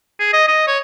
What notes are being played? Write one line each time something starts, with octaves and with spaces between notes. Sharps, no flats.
G#4
D#5
D#5
C#5